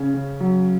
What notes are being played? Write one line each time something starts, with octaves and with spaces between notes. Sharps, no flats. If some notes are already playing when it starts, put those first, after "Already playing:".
Already playing: C#3 C#4
C#3
F#3